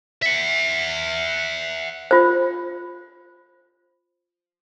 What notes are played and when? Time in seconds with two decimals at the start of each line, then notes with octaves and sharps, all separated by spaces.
0.22 E5 F#5
2.11 F4 C5